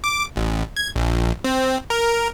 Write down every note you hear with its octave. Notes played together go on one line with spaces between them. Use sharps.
D6
A1
G#6
A#1
C4
A#4